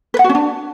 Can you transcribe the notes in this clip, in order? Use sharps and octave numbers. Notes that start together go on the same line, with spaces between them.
B4
F#5
F#4
C#4
D4